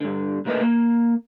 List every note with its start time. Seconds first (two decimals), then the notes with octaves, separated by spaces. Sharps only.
0.01 G2 D3
0.45 B1 A#2 A3 A#4 B4 D#5
0.61 A#3